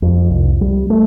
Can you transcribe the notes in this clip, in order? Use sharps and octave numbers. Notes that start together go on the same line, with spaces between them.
F2
C2
G3
A3